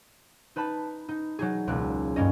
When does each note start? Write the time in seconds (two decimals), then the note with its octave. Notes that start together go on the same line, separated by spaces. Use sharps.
0.56 D#4 B4 A5 B5
1.09 D#4
1.39 F#3 D#4 G#4
1.67 E1 C#2 A#3 F#6
2.16 G2 A#3 C#4 D#5